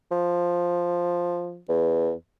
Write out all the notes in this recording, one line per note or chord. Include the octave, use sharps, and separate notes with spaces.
F3
E2